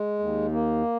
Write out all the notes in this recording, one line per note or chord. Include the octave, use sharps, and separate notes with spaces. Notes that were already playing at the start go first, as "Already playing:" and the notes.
Already playing: G#3
D#2
A#3